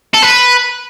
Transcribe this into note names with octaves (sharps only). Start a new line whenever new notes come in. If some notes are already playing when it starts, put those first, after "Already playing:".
A4
B4